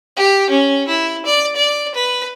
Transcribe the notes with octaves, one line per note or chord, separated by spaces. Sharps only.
G4
C#4
E4
D5
D5
B4